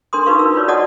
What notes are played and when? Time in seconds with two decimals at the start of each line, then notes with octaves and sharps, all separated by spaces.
0.13 D4 A#4 C6 D#6
0.26 D#4 F#4 B4 F5 C#6
0.39 E6
0.54 F4 B4 C#5 D5
0.68 F#4 D5 D#5 F#5 A5 D#6